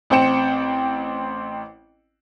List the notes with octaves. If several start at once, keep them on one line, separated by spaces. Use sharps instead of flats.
A1 C4 C5 G5 C#7 E7